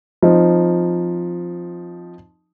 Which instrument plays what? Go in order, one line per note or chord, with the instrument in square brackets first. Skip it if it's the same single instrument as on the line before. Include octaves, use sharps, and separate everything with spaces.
[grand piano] F3 C4 D#4